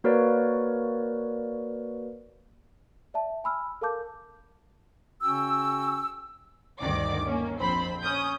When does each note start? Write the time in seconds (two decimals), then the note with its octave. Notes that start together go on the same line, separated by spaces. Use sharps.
0.04 A#3 F#4 A#4 B4 C#5 D5
3.14 D5 E5 A5
3.44 G#5 B5 E6 F6
3.81 A4 A#4 F5 A5 D6 G6
5.22 C#3 C#4 F#4 G5 E6
6.81 D2 G2 D#3 D5 D6
7.26 A#3 C#4
7.58 A#1 F2 C4 C5 B5
8.01 C#4 D#6 G6